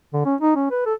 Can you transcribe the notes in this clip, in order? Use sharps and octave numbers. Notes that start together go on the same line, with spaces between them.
D3
C#4
D#4
C#4
B4
A4